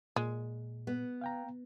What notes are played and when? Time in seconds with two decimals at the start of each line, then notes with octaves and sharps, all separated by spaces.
0.16 A#2 G#3
0.87 B3
1.21 F5 G5 A#5